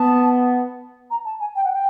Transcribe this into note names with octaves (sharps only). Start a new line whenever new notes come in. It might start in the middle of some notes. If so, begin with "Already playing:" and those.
Already playing: B3 A5
A#5
A5
G#5
G5
F#5
G5